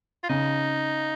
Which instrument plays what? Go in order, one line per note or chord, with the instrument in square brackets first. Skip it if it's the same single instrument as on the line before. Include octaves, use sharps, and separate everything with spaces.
[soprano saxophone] F4
[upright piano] C#3 [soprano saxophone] D#4